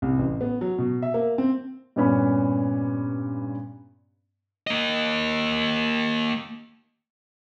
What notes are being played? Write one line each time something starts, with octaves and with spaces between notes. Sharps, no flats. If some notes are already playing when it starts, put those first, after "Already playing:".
C2
A1
B3
F#3
B2
E5
A#3
C4
G2 A#2 B3 C#4 B5
A#3 D#5